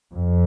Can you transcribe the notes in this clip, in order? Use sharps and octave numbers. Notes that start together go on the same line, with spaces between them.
F2